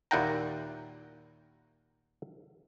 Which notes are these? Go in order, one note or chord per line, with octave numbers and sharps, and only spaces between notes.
D#2 A#2 E4 F#5 G5 A#5